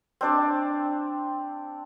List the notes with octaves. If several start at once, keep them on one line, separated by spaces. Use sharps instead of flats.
C4 D4 D5